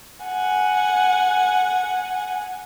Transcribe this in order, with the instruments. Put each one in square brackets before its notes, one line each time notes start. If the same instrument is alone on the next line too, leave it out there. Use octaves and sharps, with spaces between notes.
[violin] F#5 G#5